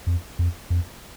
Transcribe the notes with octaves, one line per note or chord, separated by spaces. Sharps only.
F2
F2
F2